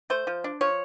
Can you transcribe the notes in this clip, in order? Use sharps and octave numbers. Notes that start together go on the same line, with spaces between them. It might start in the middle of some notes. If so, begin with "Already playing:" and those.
A3 C5
F3
D4
F3 C#5